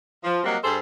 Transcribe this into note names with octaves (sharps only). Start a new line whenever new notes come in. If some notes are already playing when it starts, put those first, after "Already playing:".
F3
F#3 G3 A#3 C4 D#5 F#5
G2 G#4 A4 C5